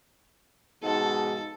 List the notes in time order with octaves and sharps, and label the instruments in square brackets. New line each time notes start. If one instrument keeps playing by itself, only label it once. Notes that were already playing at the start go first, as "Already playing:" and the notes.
[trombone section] G#2 B2 F3 [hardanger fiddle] A4